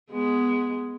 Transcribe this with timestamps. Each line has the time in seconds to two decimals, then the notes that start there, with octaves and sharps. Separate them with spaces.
0.11 G#3 B3